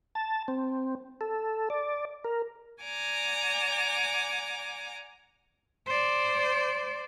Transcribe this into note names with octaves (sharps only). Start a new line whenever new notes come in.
A5
C4
A4
D5
A#4
D5 F#5 G#5 A#5 D6
C5 D5